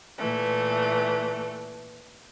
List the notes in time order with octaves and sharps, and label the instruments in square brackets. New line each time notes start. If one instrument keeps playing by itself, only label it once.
[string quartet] A#2 E3 A3